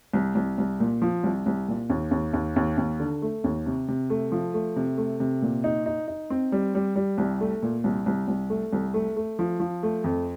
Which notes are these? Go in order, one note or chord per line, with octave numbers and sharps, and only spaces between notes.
C2
C2
C2
A#2
F3
C2
C2
A#2
D#2
D#2
D#2
D#2
D#2
D3
A3
D#2
C3
C3
A3
F3
A3
C3
A3
C3
A#2
D#4
D#4
D#4
C4
G3
G3
G3
C2
A3
A#2
C2
C2
C2
A3
C2
A3
A3
F3
F3
A3
F2